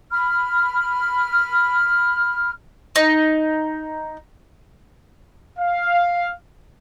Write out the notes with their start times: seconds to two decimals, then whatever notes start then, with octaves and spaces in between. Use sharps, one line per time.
0.11 B5 F6
2.96 D#4
5.59 F5